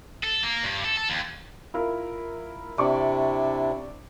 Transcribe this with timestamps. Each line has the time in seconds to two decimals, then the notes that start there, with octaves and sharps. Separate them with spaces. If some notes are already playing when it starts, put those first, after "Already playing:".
0.23 A4
0.43 A#3
0.63 G2
0.84 A4
0.97 A4
1.10 D#2
1.74 E4 F4 A#4
2.78 C3 D4 E4 D5 C#6 D6